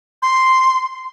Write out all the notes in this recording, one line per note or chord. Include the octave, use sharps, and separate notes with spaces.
C6